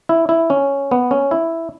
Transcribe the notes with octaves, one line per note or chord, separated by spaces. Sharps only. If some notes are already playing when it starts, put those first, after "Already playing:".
E4
E4
C#4
B3
C#4
E4